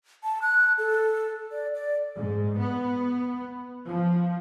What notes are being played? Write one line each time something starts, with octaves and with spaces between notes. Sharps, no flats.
A5
F#6
A4
D5
D5
G#2
B3
F3